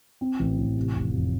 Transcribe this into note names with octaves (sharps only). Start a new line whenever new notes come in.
C4
A1
A1
C3
F1
F2